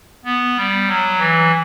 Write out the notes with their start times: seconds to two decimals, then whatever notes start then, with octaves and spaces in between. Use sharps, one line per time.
0.25 B3
0.56 G3
0.87 F#3
1.19 E3